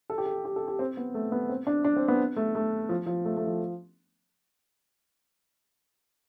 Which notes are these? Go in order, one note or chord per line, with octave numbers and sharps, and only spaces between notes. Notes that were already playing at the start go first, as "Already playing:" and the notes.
A4
G4
A4
G4
A4
G4
C4
B3
A3
B3
C4
D4
D4
C4
B3
A3
A3
F3
F3
A3
A3
F3